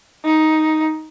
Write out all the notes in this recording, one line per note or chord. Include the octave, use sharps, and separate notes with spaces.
D#4